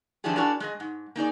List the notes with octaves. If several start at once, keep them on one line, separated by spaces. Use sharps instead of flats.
E3 F3 D4 E4 G4 G#4
D4 E4 F#4 G#4 A#4 D5
G#3 G#4 D#5
G#2
A#3 D#4 G#4 D5